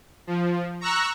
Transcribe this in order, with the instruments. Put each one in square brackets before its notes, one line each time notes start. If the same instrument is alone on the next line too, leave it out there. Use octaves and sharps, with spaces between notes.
[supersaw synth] F3
A#5 C#6 E6 F#6